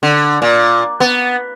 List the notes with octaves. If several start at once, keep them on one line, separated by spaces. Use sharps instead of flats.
D3
A#2
B3